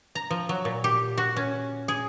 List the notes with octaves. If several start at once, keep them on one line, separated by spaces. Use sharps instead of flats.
A#5
F3
F#3
A#2
G4
F#4
C#4
G#4